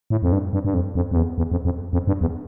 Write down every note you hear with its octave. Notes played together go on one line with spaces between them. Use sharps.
A2
F2
G2
G2
G2
F2
F2
F2
E2
E2
F2
F2
F2
G2
E2